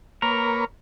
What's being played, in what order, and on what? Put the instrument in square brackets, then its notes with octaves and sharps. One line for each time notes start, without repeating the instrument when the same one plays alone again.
[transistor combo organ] A#3 B4 C#5 [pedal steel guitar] A#4